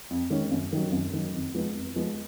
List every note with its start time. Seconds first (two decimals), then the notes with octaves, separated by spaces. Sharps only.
0.10 F2
0.30 D#3 G#3 C#4
0.51 F#2
0.73 D#3 F#3
0.92 F#2
1.13 D#3 F#3
1.34 F2
1.55 F3 G#3 B3
1.75 F2
1.96 F3 G#3 B3